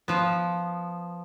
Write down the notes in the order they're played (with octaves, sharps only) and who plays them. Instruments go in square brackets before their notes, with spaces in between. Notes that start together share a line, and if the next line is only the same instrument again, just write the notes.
[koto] F3 B3